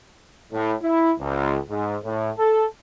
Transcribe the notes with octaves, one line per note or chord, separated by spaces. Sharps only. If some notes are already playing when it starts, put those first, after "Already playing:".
A2
E4
C#2
G#2
A2
A4